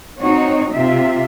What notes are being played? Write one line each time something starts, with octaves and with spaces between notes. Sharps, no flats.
C4 D#4 F#4 C#5
C3 F4 E5